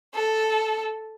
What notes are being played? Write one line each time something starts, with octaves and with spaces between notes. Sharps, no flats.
A4